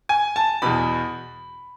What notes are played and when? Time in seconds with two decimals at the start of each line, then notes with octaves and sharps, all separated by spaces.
0.09 G#5
0.36 A5
0.62 E2 B2 B5